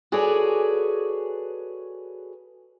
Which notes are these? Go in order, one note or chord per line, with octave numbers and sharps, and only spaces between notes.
F#4 G#4 A4 B4 C#5 D5